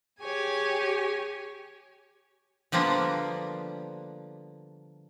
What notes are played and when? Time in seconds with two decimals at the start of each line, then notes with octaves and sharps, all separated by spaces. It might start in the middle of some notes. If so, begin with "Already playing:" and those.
0.20 G4 G#4 C#5 G#5
2.72 D3 F3 G3 A#3 B3